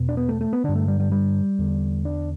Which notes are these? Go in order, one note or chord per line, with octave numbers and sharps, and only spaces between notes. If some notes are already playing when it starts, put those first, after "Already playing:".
Already playing: E2 B2
D4
B3
A3
A3
B3
G2 D3 D4
A3
G3
G3
G3
E2 D3
D4